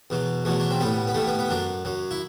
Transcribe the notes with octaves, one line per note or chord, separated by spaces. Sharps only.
E2 B2 F#3
E2 B2 F#3 A3
D4
C4
A2 G3 B3
B3
A2 G3 A3
B3
B3
F#2 F#3 D4
F#2 F#3
E4